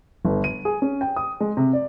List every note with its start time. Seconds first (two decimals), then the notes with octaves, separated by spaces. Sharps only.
0.25 G1
0.44 D#7
0.65 G#4
0.82 C#4
1.01 G5
1.16 D#6
1.40 G#3
1.57 C3
1.73 D5